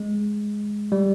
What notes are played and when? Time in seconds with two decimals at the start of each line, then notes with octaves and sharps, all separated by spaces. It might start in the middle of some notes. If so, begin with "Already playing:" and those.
Already playing: G#3
0.92 G3